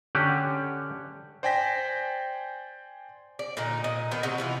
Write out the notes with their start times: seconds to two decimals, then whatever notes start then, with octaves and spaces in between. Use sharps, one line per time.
0.15 D3 C#4 G4 F#5 G5
1.43 C5 D5 G5 G#5 A#6 B6
3.39 D5
3.57 A#2 D3 D#4
3.84 A#2 D#5
4.11 D#3 B3 D4
4.23 C3 F#4 C5 D#5
4.38 E3 B3 F4